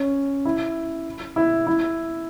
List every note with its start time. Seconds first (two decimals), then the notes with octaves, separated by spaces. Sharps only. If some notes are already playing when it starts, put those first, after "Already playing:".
Already playing: C#4
0.45 E4
1.36 E4
1.67 E4